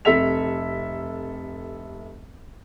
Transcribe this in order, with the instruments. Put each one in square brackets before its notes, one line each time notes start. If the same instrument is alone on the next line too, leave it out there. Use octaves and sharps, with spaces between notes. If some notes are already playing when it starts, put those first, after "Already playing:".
[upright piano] F1 C3 A4 E5 B6 F7